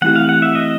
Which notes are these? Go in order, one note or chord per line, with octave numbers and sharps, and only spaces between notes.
E3 A3 C4 E4 G4 F#5
F5
F#5
E5
D#5